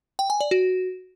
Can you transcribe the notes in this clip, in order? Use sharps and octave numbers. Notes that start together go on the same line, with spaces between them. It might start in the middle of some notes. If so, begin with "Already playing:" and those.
G5
G#5
D5
F#4